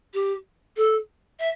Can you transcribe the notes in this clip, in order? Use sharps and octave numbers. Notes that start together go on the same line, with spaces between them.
G4
A4
E5